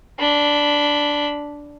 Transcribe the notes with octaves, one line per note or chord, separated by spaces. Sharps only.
D4 B5